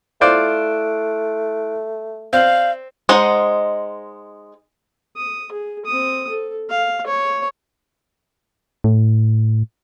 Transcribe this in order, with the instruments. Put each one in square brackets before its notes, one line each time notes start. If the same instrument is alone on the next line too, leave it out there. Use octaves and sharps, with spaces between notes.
[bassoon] A3 [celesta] E4 F#6 D7 [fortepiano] F4 C5 D5
[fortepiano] C4 [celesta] D5 G6 F#7 [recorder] F5
[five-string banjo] G#3 D#4 C5 D#5 F#5
[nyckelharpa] D#6
G#4
C4 D#6
A4
F5
C#5 C#6
[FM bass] A2